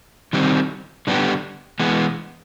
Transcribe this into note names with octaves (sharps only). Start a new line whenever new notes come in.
D#3 G3 C4
D3 G3 B3 E4 G4
E3 G#3 B3